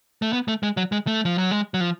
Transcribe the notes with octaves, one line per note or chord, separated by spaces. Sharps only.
A3
B3
A3
G#3
F#3
G#3
A3
F3
F#3
G#3
F#3
F3